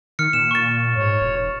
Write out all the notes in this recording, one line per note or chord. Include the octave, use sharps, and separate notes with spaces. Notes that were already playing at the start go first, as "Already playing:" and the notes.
D#3 F6 C#7
A#2 E7
C#6 A6
G#2 C#5
E1